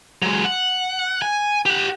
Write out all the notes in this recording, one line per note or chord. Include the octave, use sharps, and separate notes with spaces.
F#3 G#3
F#5
G#5
G4 F#5